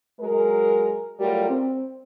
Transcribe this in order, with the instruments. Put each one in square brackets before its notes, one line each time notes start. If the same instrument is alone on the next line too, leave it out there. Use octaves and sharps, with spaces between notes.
[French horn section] F#3 G#3 A#4
F#3 G3 A3 F4 A#4
C4